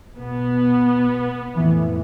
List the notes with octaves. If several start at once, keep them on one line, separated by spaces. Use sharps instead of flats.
B2 B3
F2 A2 E3